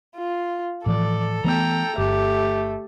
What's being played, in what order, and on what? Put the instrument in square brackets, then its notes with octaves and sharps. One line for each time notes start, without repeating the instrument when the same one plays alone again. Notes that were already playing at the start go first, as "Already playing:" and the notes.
[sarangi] F4
[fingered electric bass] A2 E3 F3 [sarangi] A4 [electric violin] D5
[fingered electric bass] E3 A3 B3 [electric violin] G5 A#5
[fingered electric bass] G1 [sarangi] A3 [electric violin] G4